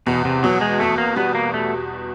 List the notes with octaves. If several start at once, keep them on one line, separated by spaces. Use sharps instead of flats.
E2 B2
C3
B2 F#3
G#3
E2 A3
A#3
G3 B3
A#3
A3